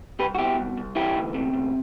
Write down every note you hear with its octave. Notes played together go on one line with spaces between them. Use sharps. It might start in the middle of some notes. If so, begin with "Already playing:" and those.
C2 G4 B4
F#4
B2 E4 G4
C2
C2
E3 E4 G4
D2
C3
D2